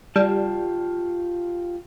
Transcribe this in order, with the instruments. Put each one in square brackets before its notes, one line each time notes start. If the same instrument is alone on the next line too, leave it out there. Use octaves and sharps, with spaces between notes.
[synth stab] G3 [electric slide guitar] F4 G4 A5